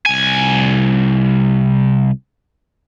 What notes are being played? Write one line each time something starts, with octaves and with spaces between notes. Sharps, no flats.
C2 G#5